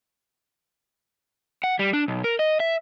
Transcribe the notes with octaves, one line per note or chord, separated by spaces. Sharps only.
F#5
G3
D4
B1
A#4
D#5
E5